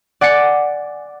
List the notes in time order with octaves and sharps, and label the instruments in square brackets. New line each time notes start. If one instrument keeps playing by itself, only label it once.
[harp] D5 F#5 G#5 D6 A6 C#7